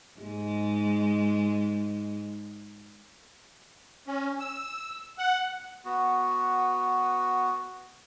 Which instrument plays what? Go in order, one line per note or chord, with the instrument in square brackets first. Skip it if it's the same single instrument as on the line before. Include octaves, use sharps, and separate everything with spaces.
[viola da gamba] G#2 G#3
[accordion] C#4
E6
F#5
[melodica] B3 F#4